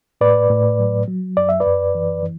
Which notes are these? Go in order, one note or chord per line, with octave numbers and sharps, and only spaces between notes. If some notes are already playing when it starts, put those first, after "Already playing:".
A2 B4 D5
A2
F#3
F#3
F#2 D5
E5
B4 D5
F#2
E3
E3